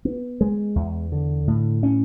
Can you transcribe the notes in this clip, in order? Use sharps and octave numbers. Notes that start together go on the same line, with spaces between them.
B3
G#3
E2
D3
A2
C#4